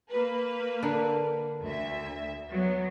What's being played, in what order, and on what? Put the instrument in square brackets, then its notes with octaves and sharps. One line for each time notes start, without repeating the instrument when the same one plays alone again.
[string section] A#3 B4
[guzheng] D3 D4 A#4
[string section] D2 E5
F#3 B3